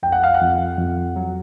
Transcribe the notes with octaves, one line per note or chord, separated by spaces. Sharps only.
F2 G5
F#5
F5
F#5
F2
F2
F#3